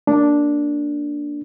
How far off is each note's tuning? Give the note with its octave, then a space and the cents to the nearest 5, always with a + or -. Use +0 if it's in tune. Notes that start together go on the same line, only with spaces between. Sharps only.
A#3 +0 D4 -5